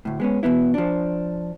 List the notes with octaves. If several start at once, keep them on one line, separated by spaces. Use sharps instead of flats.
D2 A2
G#3 B3 C#4
B2 E3 B3 E4
F3 D4